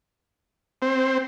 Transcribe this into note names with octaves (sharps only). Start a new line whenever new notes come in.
C4